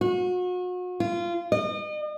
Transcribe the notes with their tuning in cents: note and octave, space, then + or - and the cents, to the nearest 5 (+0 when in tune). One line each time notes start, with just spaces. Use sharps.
F#4 -35
F4 -20
D#5 -40